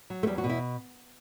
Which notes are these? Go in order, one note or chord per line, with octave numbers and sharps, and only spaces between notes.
F#3
A3
E2 G3
F#4
B2
E4